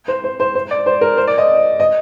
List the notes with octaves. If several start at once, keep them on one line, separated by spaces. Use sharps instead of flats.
C5
C5
C5
C5
D5
C5
A#4
C5
D5
D#5
D#5